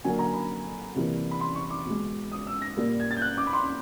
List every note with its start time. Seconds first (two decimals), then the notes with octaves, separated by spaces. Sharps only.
0.04 D3 F#3 A#3 G#5
0.19 A#5
0.34 B5
0.95 C3 E3 G3 A#3
1.31 B5
1.40 C6
1.55 C#6
1.70 D6
1.86 B2 G#3
2.31 D#6
2.47 E6
2.62 A#6
2.77 A#2 G3 A#3
3.00 G#6
3.11 A6
3.17 G6
3.22 F#6
3.37 D6
3.47 B5
3.53 C6